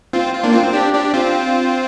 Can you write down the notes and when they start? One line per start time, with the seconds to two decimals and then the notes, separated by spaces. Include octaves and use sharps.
0.13 C4 F4
0.34 F4
0.43 A#3 D4
0.53 C4 F4
0.64 C4
0.73 D4 G4
0.94 D4 G4
1.14 C4 F4